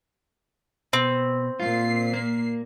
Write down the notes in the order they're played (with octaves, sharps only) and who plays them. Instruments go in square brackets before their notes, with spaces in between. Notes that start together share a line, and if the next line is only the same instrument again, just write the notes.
[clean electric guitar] B2 [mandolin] C4
[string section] A#2 C7 [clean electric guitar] F4
[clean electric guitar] A#3